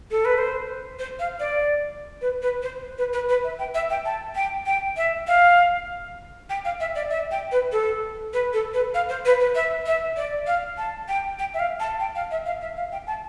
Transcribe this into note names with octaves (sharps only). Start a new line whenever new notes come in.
A4
B4
C5
C5
F5
D5
B4
B4
C5
B4
B4
B4
E5
G5
E5
G5
A5
G5
G5
E5
F5
G5
F5
E5
D5
E5
G5
B4
A4
B4
A4
B4
F5
C5
B4
B4
E5
E5
D5
F5
A5
G5
G5
E5
F5
A5
G5
F5
E5
F5
E5
F5
G5
A5